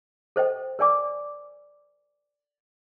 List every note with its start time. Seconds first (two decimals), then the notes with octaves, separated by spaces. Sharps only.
0.36 A4 C5 D#5 G5
0.79 A#4 D5 G#5 D6